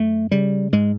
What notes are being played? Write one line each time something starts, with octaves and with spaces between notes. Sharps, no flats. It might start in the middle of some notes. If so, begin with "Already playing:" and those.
Already playing: F#2 A3
C#3 G3
G#2 G#3